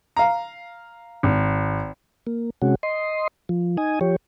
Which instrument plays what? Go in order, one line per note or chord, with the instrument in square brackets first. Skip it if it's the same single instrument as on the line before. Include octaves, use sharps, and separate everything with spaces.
[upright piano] F5 A#5
[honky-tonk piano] G#1
[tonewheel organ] A#3
C3 G#3 C#4 F#4
D#5 C6
F3
D#4 G#5 D#6
F3 G4 C#5